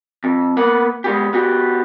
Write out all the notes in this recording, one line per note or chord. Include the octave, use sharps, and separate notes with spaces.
F2
A#3 B3 F#5
G#3 B3 G4
B3 F#4 G4